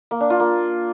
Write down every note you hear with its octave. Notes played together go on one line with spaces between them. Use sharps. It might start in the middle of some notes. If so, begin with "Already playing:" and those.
A#3
D4
F4
A#3